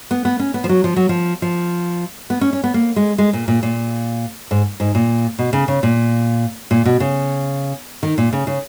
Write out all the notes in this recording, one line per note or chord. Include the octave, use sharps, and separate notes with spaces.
B3
B3
C#4
B3
F3
F#3
F3
F#3
F3
F3
B3
C#4
C#4
B3
A#3
G#3
G#3
A#2
A#2
A#2
G#2
G#2
A#2
B2
C#3
C#3
A#2
A#2
B2
C#3
D#3
A#2
C#3
C#3